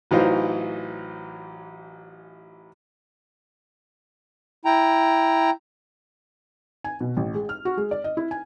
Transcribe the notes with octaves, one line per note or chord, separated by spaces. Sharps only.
A1 E3 F#3 D#4 F4 C5
E4 G5 A#5
G#5
B2
A1
G#3
F6
F#4
G#3
D5
D#5
E4
G#5